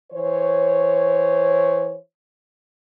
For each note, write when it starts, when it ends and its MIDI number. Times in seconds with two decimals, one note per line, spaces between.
0.11 1.96 52
0.11 1.96 72
0.11 1.96 73